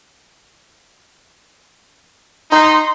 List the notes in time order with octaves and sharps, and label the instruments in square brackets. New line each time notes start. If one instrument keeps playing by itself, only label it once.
[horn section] D#4 [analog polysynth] C6